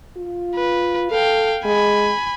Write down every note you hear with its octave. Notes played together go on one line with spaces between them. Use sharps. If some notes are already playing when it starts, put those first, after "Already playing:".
F4
B4
A4 F5 G5
G#3 G#5 B5